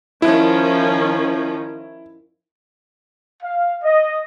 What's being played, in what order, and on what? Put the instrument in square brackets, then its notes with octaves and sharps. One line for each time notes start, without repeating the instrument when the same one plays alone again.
[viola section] D#3 F3 C#4 [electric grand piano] E4
[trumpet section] F5
D#5